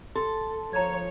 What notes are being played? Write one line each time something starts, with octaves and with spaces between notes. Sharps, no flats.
A4 C6
F3 C#5 A#5 G#6